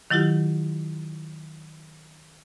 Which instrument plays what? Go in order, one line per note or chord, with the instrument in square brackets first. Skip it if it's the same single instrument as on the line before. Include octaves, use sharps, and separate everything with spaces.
[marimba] D#3 F#3 E4 F4 G4